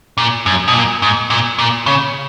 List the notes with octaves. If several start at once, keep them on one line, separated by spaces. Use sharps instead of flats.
A#2
F#2
B2
A#2
G#2
A#2
A#2
C#3